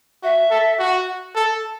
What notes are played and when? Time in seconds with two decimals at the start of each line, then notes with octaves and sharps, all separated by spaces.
0.23 F#4 E5
0.51 A4
0.79 F#4
1.35 A4